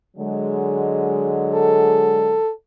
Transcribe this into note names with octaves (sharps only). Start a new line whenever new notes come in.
D3 F#3 G#3
A4